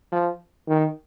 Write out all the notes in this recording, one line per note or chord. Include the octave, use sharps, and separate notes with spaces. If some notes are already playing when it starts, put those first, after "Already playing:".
F3
D#3